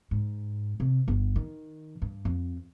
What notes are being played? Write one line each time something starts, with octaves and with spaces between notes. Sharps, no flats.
G#2
C3
G1
D#3
G2
F2